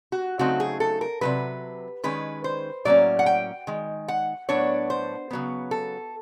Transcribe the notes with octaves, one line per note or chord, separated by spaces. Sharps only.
F#4
C#3 F#3 A3 C4 D#4 F#4
G#4
A4
A#4
C3 D#3 F#3 B4
D#3 G#3 C#4 B4
C5
A2 F#3 A#3 C#4 D5
F#5
G5
D#3 G#3
F#5
A2 F#3 B3 D4 C#5
C5
C#3 F#3 B3
A4